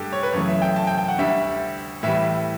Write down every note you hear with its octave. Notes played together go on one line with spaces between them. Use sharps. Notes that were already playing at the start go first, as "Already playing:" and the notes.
Already playing: G2 D3 A3 G4 A4
C#5
B4
F#2 C#3 E3 A3 C#5
E5
G5
A5
G5
G5
F#5
D2 D3 G3 E5
A2 E3 G3 E5